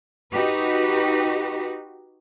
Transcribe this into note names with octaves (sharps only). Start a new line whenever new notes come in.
D#4 F#4 G4 B4